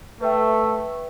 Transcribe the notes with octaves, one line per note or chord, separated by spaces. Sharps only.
A3 B4 E5 G5